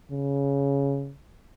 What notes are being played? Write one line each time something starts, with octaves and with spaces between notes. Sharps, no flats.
C#3